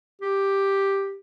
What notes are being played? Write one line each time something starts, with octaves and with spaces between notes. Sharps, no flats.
G4